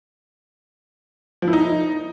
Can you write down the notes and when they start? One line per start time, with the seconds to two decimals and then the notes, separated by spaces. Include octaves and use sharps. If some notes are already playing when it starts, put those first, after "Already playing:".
1.42 F3
1.48 E4
1.53 D#4